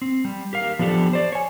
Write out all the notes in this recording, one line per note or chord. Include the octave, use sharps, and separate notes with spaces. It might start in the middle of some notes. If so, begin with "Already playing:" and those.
C4
G3
G4 A#4 F5
F3 B3 D4 G4 A4
C5 D5
C#5 G#5